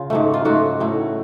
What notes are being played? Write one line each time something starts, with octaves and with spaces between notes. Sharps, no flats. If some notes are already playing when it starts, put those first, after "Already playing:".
Already playing: C#3 F4
G#2 F#3 A3
F4
G#2 F#3 A3 F#4
A2 F#3 A3